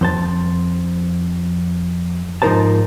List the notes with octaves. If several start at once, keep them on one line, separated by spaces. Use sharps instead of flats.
F2 C5 A5
G#2 F3 D#4 A#4 C5 A5